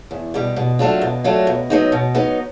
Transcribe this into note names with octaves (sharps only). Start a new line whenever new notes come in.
E2
B2 G3
B2
F#3 A3 D4 F4
B2
F#3 A3 D4 F4
B2
F#3 B3 D#4
B2
F#3 B3 D#4